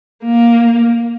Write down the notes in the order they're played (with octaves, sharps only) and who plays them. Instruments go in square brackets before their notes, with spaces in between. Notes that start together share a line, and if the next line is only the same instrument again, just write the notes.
[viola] A#3